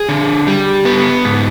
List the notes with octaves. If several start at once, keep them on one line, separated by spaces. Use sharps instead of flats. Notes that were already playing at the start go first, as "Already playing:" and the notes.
Already playing: G#4
D3
G3
B3
G#2